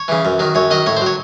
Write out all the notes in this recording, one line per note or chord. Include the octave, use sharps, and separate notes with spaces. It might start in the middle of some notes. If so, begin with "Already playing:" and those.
Already playing: C#5
C#3 E3
F#2
D#3 F#3
F#2 C#5
D#3 F#3 D#5
A2 C#5
C5
F#3
C#5